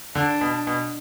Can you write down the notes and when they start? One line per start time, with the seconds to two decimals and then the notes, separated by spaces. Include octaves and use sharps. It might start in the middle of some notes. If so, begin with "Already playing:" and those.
0.15 D3 D4
0.41 B2
0.67 B2